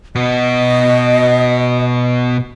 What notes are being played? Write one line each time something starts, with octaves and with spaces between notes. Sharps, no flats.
B2 F#4 D#5